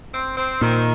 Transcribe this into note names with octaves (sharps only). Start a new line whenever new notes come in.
C4
C4
A#2 D#3